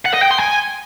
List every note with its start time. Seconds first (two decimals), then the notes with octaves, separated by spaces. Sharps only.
0.06 F#5
0.14 D#5
0.22 G5
0.31 C6
0.39 G#5